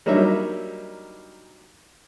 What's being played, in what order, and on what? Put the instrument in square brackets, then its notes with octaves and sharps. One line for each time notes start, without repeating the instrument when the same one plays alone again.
[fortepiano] F#3 G3 A#3 D4 D#4 E5